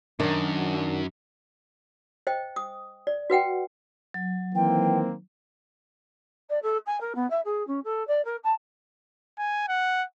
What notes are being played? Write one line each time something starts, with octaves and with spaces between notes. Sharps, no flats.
F#2 D#3 F#3 D4
C5 D#5 G5
D#6
D5
F#4 B4 F#5 G5
F#3
D#3 E3 A#3 C4 G5
D5
A4
G#5
A#4
B3
E5
G#4
C#4
A4
D5
A#4
A5
G#5
F#5